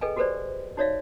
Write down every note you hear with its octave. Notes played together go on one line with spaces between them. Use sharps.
G#4 A4 B4 D#5 G5 G#5
F#4 G4 A4 B4 C5 D5
D#4 F#4 C#5 D5 E5 F5